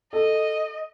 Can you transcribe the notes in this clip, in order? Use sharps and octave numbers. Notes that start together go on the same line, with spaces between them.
A4 D#5